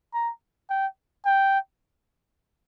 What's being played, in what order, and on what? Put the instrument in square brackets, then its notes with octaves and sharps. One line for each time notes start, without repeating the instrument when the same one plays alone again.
[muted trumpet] A#5
G5
G5